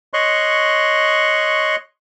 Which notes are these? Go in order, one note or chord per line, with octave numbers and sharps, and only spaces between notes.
C#5 D#5 C6 C#6 F#6